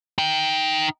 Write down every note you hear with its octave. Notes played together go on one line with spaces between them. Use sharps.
D#4 G5